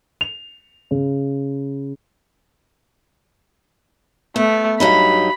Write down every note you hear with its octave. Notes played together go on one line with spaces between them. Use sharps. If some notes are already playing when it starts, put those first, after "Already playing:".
F7
C#3
A3 B3
G2 F#3 D#4 B5